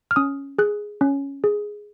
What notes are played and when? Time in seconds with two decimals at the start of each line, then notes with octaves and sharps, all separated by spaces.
0.11 F6
0.16 C#4 D#6
0.59 G#4 F#6
1.01 C#4
1.44 G#4